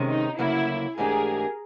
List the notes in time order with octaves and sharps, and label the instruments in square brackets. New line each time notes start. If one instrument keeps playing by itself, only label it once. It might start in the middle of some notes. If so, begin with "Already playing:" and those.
Already playing: [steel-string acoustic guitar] C3 D#3 G#3 C#4
[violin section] D#4
[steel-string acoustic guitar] D2 C#3 F#3 A#3 [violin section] E4
[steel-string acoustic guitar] G#2 E3 A3 D4 G4 [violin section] G#4 A#4